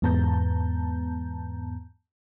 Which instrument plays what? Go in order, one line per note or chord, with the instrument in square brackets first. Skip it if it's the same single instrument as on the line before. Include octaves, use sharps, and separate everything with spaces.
[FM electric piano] E2 G#2 B3 A5 A#5 G6